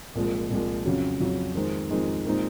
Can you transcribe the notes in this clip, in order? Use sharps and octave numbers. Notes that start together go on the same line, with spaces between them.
C2 A#2 F3 G#3
C2 A#2 F3 G#3
F2 C#3 F#3 C#4
F2 C#3 F#3 C#4
F2 D#3 G#3 C4 D#4
F2 D#3 G#3 C4 D#4
A#2 G#3 C4 D#4